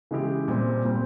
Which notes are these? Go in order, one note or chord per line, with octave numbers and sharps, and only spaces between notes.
C#3 E3 G#3 E4 G4
A#2 G3 C4
A#2 G3 C4